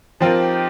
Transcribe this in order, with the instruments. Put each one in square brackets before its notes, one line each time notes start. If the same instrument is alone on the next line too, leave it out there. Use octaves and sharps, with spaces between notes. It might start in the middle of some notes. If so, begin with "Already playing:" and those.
[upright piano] F3 C4 F4 A#4 [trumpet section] D#4 G4